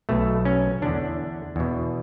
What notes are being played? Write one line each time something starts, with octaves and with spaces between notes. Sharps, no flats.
B1 B2 A3
C#4
E2 D3 D4
E2 B2